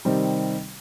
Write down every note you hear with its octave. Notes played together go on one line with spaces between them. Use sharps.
C3 D#3 G3 C4